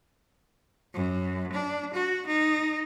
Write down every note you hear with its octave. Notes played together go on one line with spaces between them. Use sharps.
F#2
D4
F#4
D#4